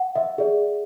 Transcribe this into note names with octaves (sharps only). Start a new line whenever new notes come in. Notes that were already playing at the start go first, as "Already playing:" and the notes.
Already playing: F#5
E5
G#4 D5